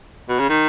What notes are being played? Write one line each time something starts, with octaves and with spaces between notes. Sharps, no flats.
B2
C#3
D#3